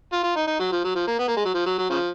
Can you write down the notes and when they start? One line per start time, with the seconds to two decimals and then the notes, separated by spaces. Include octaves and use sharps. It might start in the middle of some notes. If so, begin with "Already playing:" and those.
0.12 F4
0.23 F4
0.36 D#4
0.47 D#4
0.59 F#3
0.72 F3
0.84 F#3
0.95 F3
1.07 A#3
1.19 B3
1.28 A#3
1.37 G#3
1.45 F#3
1.54 F3
1.66 F#3
1.78 F#3
1.90 C#3 F3